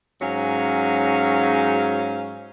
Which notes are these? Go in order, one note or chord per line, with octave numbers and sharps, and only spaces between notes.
G#2 F#3 C#4 F5